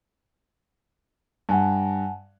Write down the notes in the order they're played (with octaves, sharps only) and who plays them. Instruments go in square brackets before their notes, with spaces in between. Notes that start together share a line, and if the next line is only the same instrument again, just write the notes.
[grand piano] G2 [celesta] F#5 G#5 A5